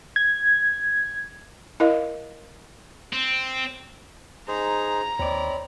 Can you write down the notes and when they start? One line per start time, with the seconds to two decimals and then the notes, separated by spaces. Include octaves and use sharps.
0.16 G#6
1.80 E4 A#4 D#5 F5
3.13 C4
4.48 D#4 G#4 C5 A#5
5.19 D#2 C4 C#5 D5 B5